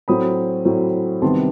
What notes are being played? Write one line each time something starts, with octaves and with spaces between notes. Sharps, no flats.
A2 F#3 C4 B5 D#6
A2 F#3 C4
C2 C3 D#3 G3 B3 A5 C6